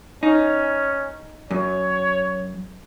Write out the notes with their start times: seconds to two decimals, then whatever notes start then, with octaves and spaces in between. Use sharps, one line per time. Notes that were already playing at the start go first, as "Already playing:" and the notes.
0.23 C#4 D#4
1.51 F#2 C#5